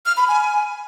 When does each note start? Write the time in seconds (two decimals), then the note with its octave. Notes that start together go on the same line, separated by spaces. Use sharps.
0.06 F6
0.17 B5
0.28 G#5